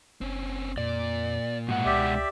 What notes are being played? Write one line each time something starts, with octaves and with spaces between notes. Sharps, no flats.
F#1 C4 C#4
F2 A#2 D5
G#2 B2 G#3 F#5
C#2 G4 D5 E5